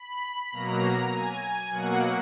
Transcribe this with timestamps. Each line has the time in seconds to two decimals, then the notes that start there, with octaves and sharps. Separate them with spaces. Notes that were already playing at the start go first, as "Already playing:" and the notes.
Already playing: B5
0.52 B2 F#3 A#3 A#5
1.11 G#5
1.71 B2 F#3 A#3 F#5